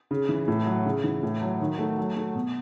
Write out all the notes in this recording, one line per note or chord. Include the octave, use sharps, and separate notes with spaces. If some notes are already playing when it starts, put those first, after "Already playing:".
C#3
E3
A2
F#3
C#3
E3
A2
F#3
D#3
A3
F#3
A3
B2